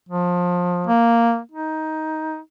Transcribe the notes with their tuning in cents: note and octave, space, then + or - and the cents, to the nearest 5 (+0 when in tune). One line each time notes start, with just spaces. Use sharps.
F3 +25
A#3 +0
D#4 +15